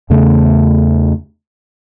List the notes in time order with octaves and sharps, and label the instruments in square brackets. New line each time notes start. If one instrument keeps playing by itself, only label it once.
[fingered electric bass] E2 C#3 A3